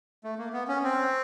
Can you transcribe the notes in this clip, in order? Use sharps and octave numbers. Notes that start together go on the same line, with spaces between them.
A3
A#3
B3
C#4
C4